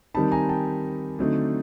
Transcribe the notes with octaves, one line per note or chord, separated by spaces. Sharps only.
D#3 G3 C4 D#4 A5 B5
G#5 A#5
G5 A5
D3 F#3 A3 C4 D#4